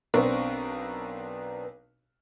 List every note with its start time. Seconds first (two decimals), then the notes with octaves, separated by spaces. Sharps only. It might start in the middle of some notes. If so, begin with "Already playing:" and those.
0.14 B1 B3 C4 D4 A#4 C#6